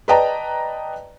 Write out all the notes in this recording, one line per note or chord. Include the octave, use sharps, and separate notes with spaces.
B4 D5 D#5 G5 A5 A#5